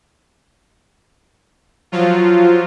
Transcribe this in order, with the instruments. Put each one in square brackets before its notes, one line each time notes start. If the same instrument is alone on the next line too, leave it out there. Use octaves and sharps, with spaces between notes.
[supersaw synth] F3 F#3 F4